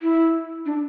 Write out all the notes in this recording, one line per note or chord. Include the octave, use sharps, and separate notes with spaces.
E4
D4